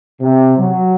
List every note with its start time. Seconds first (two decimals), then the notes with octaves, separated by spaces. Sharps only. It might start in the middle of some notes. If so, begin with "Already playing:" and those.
0.21 C3
0.58 F#3